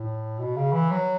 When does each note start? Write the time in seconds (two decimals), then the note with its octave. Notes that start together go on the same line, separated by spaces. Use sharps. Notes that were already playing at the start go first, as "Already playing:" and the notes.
Already playing: A2
0.39 B2
0.56 C#3
0.73 E3
0.91 F#3